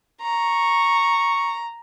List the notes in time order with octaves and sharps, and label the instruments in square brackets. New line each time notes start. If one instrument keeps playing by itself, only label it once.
[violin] A#5 [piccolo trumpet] C#6